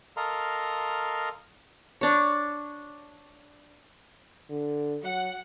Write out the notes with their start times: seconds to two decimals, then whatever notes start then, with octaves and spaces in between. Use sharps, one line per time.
0.17 A4 A#4 D#5 F5 A#5 C6
2.01 D4 C#5
4.50 D3
5.04 F#3 F#5